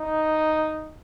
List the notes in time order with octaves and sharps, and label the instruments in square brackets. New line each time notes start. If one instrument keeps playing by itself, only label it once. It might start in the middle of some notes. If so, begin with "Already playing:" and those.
Already playing: [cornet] D#4